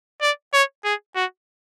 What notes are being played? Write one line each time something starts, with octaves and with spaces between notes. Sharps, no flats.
D5
C#5
G#4
F#4